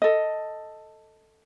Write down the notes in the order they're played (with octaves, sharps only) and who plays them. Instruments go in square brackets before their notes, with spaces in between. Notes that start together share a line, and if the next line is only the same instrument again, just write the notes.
[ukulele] A4 D#5